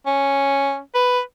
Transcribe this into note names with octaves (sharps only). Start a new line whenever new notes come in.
C#4
B4